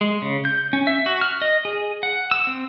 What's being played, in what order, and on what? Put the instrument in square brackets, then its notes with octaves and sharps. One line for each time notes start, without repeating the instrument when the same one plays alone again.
[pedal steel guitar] G#3
C#3
G6
C#4
E5
F#4
F6
D#5
G#4
F#5
E6
C4